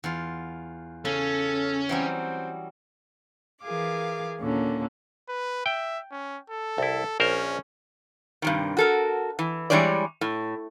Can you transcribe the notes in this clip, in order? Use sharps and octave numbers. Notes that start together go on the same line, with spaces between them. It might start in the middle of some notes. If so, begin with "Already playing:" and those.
E2 F4
C#3 C#4 A4
E3 F#3 G3 C4
E3 G#4 A#4 F5 D6
D#2 A#2 D3 A#3 C#4
B4
E5 G5
C#4
A4
C2 E4
A#1 C#4 A#4 C5
G2 C3 D#3
F#4 A4 A#4
E3
E3 G3 G#3 D4 C#5 D5
A2